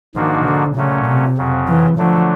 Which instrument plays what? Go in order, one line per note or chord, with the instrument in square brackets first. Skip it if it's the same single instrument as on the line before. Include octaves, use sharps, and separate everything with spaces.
[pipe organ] G#2 F3 A#3 D4 F#4 [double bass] D#3
[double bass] D3
[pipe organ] A#2 F#3 A3 C#4 [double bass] C#3
[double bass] C3
[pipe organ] F2 C#3 F#3
[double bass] E3
[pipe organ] D3 F#3 A3 D4 [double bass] F3